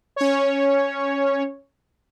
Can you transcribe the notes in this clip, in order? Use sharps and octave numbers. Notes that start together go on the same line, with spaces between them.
C#4 C#5